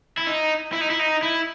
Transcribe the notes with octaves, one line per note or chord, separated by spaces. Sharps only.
E4
D#4
E4
D#4
E4
D#4
E4